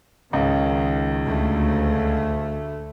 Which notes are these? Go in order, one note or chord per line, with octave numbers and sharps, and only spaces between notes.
C#2 D#3
D2 A3